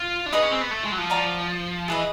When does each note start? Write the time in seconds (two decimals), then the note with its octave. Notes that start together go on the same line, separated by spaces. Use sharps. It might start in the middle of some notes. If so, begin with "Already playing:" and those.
Already playing: F4
0.26 D4
0.32 D#4 G#4 B4 D#5 G#5
0.42 C#4
0.51 C4
0.61 B3
0.71 A3
0.84 G#3
0.92 F#3
0.98 F3
1.10 D5 F#5 A#5 D6
1.88 E3 G#4 B4 D#5